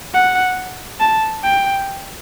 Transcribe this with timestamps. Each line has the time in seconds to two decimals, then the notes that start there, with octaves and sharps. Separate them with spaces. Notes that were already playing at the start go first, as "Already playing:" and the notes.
0.14 F#5
1.00 A5
1.43 G5